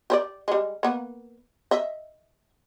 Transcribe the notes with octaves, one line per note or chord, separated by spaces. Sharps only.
G4 C5 D5
G3 G#3
A#3 B3
D#5 E5